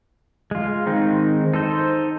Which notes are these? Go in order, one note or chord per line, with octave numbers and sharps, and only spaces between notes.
G#3 F4
D#3 G#3 C4 D#4
D#4 A4 C5